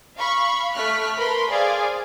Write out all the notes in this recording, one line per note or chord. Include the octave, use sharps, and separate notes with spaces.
F5 B5 C#6
A3 C#6 F6 F#6 B6
A#4 B4 B5 C6
G#4 C5 D5 F5